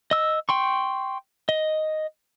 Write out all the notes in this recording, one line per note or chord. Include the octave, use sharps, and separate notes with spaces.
D#5 E6
G5 C6 C#6
D#5